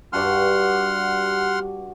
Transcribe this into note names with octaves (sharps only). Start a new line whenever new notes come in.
G2 F#4 F#5 A5 C6 F6